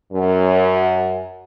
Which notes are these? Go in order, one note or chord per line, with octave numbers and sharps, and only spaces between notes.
F#2